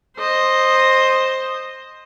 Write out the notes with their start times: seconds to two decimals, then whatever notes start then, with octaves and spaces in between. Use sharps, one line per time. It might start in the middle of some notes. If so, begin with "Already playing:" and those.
0.17 C5 D#5